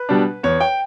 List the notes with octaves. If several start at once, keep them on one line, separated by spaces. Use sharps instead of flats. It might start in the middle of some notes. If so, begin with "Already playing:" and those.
Already playing: B4
B2 G3 D4
E2 C#5
G5